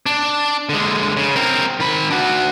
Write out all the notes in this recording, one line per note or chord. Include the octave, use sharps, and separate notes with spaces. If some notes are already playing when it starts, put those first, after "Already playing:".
D4
D3 G#3
C#3
C4 A#4
D#3 B5
D4 F#4